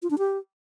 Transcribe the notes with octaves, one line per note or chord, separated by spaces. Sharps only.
F4
D4
G4